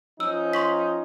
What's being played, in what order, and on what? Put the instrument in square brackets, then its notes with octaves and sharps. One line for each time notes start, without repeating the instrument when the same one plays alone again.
[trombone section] F3 C#4 D#4 [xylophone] E6
[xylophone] C6 C#6 B6